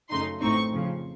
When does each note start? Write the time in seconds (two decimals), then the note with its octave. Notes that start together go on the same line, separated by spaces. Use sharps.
0.10 F#2 C#3 A3 D#4 C6
0.41 A1 A2 A3 C4 D#4 C#6
0.72 F2 C#3 F3